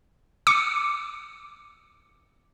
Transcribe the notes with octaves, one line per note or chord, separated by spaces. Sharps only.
D6 C#7